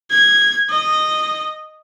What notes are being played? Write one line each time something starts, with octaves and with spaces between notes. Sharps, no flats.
G#6
D#5